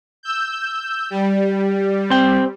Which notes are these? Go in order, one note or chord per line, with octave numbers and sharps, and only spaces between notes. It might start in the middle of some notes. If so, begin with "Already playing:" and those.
E6 G6
G3
C4 G5